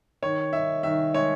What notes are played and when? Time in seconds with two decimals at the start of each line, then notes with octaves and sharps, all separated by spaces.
0.22 D#3 C#5
0.53 D#4 E5
0.83 D#3 E5
1.14 G#3 C#5